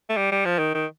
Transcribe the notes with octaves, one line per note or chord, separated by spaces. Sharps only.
A3
G3
G3
F3
D#3
D#3